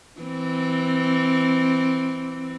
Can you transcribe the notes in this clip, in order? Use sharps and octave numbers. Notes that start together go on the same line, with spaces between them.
E3 C4